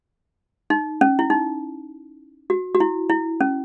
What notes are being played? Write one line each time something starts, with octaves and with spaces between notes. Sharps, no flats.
D#4
C#4
E4
D#4
F#4
F#4
E4
E4
C#4